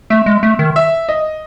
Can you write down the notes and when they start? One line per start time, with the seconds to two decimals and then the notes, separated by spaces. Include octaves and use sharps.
0.10 A3 E5
0.26 G#3
0.43 A3
0.59 D#3
0.76 E5
1.09 D#5